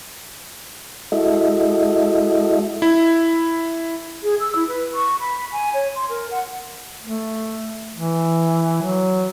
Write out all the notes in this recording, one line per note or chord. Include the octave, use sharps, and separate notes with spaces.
G#3 E4 F#4 A4 D#5 E5
E4
G#4
E6
E4
B4
C#6
B5
G#5
C#5
C6
A#4
F#5
A3
E3
F#3